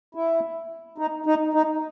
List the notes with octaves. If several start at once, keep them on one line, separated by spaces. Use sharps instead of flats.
E4
D#4
D#4
D#4